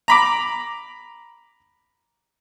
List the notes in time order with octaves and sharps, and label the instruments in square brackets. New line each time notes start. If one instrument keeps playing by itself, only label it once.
[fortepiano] A#5 B5 D6